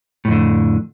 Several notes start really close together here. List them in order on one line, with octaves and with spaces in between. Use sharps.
A2 F2 D3